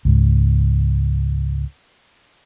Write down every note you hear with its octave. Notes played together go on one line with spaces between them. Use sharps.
C#2 G#2